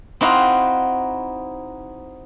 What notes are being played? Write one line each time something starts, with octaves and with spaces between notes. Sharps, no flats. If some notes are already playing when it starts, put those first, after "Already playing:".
C4 D#4 E4 F#4 F5